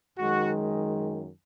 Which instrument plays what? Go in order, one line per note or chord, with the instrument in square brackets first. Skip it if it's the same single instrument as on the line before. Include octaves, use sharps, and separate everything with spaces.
[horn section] F#2 D#3 G#3 F#4